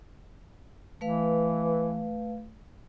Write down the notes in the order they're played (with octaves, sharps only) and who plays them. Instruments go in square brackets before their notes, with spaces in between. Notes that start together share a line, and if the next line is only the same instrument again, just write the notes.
[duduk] E3 [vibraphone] A3 B4 F5